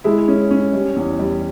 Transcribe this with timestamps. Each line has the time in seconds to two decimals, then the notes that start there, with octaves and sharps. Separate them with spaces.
0.04 G#3 E4
0.28 C#4
0.51 C#4
0.73 G3
0.96 E2
1.19 G3